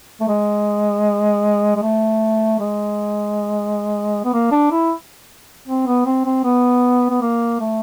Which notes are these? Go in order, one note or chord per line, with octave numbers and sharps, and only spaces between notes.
A3
G#3
G#3
A3
G#3
B3
A#3
D4
E4
C4
B3
C4
C4
B3
B3
A#3
A3